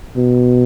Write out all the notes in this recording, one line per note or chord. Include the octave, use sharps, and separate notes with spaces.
B2